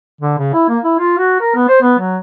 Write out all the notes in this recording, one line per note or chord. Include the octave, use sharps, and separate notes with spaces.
D3
C#3
E4
A#3
E4
F4
F#4
A#4
B3
C5
B3
F#3